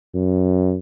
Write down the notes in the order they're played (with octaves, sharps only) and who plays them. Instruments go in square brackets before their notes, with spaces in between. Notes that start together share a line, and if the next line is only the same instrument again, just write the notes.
[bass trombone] F#2